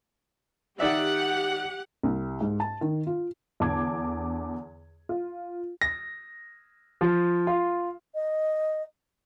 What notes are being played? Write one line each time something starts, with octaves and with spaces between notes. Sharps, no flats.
D#3 G4 D5 E5 F#5
C2
G#2
A5
D#3
F4
E2 D3 A5 D6 G#6
F4
A#6
F3
F4
D#5